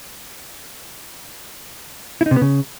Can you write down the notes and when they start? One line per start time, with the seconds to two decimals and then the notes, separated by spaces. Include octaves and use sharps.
2.21 E4
2.26 D#4
2.31 C3
2.36 B3
2.41 C#3